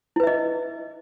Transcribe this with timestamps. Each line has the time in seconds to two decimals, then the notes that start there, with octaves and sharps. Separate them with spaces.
0.16 E4
0.20 B4
0.23 E5
0.27 D#5